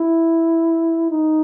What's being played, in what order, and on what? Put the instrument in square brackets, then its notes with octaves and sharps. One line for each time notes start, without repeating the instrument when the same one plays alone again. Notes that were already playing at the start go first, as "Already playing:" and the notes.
Already playing: [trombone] E4
D#4